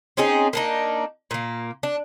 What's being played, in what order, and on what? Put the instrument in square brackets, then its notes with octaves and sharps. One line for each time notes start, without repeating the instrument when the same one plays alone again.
[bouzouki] C4 C#4 D#4 G#4
A#3 D4 D#4
A#2 A#3
D4